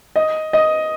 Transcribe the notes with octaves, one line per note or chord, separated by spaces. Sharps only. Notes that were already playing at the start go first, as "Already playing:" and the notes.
D#5
D#5